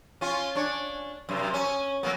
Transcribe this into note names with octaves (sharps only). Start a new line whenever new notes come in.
C#4 F4
D4 C#5
F#2 C3
C#4
F#3 A#3 B3